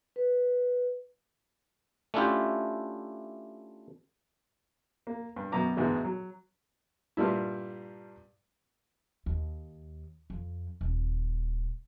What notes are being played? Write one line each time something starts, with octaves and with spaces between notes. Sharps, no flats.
B4
A3 C#4 D4 E4 F4 G4
A#3
G2
F#2 B2 A#5 D6
D2 G#2 B2 E3 G#3
F#3
G2 A#2 G3 E4
D#2
F2
D#1